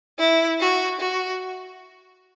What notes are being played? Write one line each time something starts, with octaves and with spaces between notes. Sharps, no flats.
E4
F#4
F#4